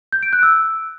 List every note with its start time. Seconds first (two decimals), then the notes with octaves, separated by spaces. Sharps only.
0.12 G6
0.23 D7
0.33 F#6
0.43 E6